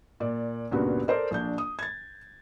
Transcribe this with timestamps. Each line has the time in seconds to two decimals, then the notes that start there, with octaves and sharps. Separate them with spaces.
0.20 A#2 D5
0.71 C#2 G2 A#2 B3 F#4
1.08 A4 A#4 C5 D5
1.31 A#1 D4 G6
1.58 D#6
1.79 G#6 A6